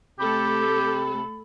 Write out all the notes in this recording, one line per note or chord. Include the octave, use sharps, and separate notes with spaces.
C3 A3 G4 A4 B5